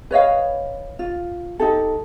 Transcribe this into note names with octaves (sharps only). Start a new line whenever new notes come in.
B4 C#5 D#5 F5
F4
D#4 G4 A4